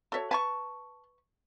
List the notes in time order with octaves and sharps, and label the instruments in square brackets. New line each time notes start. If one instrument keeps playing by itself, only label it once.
[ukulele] F#4 C#5 [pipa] A4 E5
[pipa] B4 G#5 C#6 [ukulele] A5